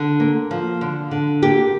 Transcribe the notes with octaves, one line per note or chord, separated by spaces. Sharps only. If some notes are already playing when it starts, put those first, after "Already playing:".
Already playing: D3
A#3
F3
D3
D3
A#3 G4